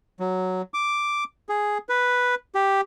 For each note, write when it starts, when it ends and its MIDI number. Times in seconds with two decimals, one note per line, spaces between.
0.20 0.62 54
0.74 1.24 86
1.49 1.78 68
1.89 2.35 71
2.55 2.81 67